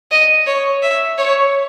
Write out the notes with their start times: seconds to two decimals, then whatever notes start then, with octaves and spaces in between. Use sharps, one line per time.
0.11 D#5
0.46 C#5
0.82 E5
1.18 C#5